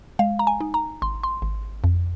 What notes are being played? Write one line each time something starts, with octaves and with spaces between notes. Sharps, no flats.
G#3 F5
A#5
G#5
D#4
A#5
G#1 C6
C6
G#1
F2